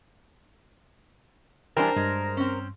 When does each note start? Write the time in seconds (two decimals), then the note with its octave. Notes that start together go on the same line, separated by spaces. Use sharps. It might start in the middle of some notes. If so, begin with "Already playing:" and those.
1.77 E3 G3 D4 A#4 C5 G5 G#5
1.96 G2 G#3
2.37 C4 C#4